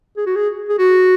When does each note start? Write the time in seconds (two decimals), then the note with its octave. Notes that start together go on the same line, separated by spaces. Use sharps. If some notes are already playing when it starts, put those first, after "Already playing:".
0.17 G#4
0.26 F#4
0.36 G#4
0.69 G#4
0.78 F#4